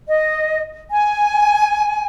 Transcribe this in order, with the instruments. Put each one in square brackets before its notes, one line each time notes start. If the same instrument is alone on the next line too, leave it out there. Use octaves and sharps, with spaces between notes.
[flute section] D#5
G#5